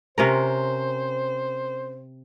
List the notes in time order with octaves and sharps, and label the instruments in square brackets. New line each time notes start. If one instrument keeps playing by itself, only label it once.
[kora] C3 C#4 A#4 [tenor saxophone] C5